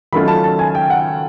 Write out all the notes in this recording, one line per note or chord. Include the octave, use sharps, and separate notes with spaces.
D#3 F#3 A3 C#4 F4 B5
A5
A5
G#5
G5
F#5